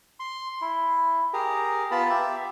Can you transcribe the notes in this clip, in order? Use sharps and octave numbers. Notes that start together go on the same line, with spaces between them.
C6
E4
G4 G#4 A#4
B3 F4 A5 B5
G4 E5